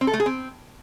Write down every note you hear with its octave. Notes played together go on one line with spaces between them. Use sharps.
C4
A4
A3
G#4
C4